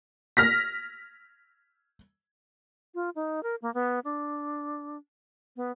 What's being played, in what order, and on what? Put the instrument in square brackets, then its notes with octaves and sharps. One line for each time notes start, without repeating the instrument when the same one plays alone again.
[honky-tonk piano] F6 A#6 B6
[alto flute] F4
D#4
A#4
A#3
B3
D4
B3